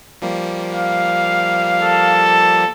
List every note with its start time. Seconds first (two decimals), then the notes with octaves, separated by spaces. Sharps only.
0.22 F3 G3 A#3
0.71 F5
1.83 A4